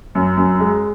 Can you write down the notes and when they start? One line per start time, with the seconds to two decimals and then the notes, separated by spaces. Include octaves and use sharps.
0.15 F#2
0.37 F#2
0.60 G#3